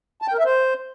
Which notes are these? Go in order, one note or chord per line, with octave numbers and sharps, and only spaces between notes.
A5
G5
A#4
E5
C5